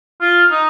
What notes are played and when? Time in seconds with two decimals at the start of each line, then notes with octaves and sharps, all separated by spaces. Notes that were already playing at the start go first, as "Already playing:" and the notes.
0.21 F4
0.51 D#4